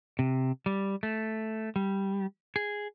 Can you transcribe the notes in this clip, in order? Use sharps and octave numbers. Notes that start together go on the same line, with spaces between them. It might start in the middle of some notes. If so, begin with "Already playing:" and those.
C3
G3
A3
G3
G#4